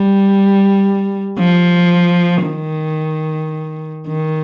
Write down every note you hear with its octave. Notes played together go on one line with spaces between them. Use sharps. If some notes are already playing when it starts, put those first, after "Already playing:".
Already playing: G3
F3
D#3
D#3